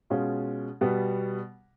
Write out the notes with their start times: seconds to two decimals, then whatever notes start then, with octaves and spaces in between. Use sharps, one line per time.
0.10 B2 G#3 C#4 F4
0.81 B2 G3 B3